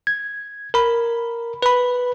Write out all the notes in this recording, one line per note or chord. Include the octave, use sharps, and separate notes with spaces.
G#6
A#4 B5
B4 B5